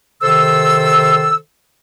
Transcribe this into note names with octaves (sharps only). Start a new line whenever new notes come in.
C3 D#3 A4 C5 E6